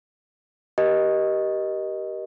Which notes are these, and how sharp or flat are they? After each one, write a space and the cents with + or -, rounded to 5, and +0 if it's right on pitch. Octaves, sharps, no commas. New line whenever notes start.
G4 -15 A#4 +35 D#5 +0